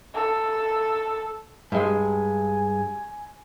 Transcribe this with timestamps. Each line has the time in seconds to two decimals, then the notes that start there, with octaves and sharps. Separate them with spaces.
0.14 A4
1.72 G2 G#3 G#5